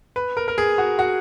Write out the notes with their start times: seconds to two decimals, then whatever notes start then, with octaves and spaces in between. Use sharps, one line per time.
0.16 B4
0.37 A#4
0.48 A#4
0.58 G#4
0.78 F#4
0.99 F#4